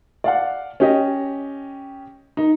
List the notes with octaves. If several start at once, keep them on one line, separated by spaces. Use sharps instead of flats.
D5 F5 F#5
C#4 G4 D#5
D#4